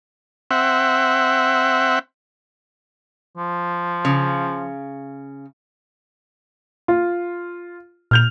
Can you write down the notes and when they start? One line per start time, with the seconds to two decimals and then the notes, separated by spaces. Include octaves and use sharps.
0.51 C4 E5 F#5
3.37 F3
4.05 C#3
6.88 F4
8.11 A#2 F6 G6 F7